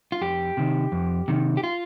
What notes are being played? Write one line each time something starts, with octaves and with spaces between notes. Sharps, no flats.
F4
F2 G4
C3 D#3
F2
C3 D#3
G4
F4